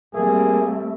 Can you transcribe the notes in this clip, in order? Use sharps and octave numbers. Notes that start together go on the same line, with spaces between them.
G3 A3 A#3 C4 G#4